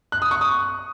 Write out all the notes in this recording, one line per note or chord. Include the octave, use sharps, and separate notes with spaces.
F#6
D#6
C#6
D#6